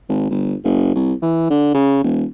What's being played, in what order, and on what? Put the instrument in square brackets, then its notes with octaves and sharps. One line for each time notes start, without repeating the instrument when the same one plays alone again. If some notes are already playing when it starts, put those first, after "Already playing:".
[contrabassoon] G#1
G1
F#1
C2
E3
D3
C#3
E1